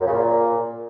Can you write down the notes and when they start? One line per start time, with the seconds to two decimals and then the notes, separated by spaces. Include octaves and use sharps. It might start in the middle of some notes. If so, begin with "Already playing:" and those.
0.01 F#2
0.06 C#3
0.12 A#2